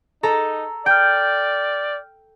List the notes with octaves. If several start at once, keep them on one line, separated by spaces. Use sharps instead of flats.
D#4 A4 A#5
D5 G5 F6 G6